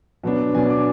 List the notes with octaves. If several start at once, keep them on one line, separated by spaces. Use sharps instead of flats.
B2 F#3 B3 D4
B2 F#3 B3 D4 G#5
D6